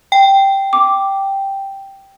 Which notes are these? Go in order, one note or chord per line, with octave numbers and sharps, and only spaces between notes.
G5
D6